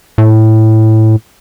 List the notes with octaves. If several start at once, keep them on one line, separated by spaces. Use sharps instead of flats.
A2